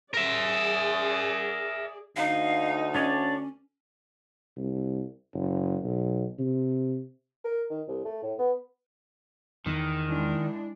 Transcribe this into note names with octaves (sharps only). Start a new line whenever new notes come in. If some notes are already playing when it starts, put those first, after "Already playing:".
G#4 A#4 D5 E5
D2 D#4 F5
C#4 D4 C#5 D5
C2
F#1
B1
C3
A#4
D#3
C2
A3
A2
B3
E2 D#3
G#3 D4 E4